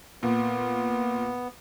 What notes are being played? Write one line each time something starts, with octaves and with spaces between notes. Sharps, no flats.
A#2 B3